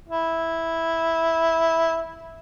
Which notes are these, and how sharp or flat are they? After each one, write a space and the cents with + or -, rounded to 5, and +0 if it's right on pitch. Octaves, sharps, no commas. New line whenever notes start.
E4 -5